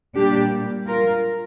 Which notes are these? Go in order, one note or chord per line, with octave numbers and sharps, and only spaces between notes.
A#2 G3 D4 G4
F4 A#4